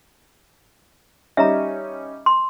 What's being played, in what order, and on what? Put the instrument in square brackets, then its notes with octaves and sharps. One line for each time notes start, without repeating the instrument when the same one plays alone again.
[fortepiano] G3 C#4 D#4 [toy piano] E5 A#5
[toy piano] C6